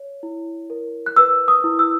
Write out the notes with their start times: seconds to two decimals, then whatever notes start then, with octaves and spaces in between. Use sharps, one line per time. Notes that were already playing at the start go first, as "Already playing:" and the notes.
Already playing: C#5
0.23 E4
0.70 A#4
1.06 F#6
1.16 B4 E6
1.48 D#6
1.64 E4
1.79 E6